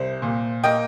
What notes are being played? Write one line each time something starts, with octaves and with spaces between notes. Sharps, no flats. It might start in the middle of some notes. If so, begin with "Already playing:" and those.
Already playing: C2 C5
A#2
A#3 D#5 G5